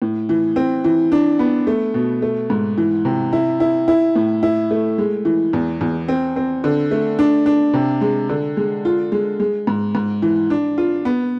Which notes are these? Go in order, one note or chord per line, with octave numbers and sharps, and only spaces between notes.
A2
E3
C4
E3
D4
B3
A3
B2
A3
G#2
E3
C3
E4
E4
E4
A2
E4
A3
G#3
E3
E2
E2
C4
C4
D3
A3
D4
D4
C3
G#3
D3
G#3
F4
G#3
G#3
G#2
G#2
E3
D4
F4
B3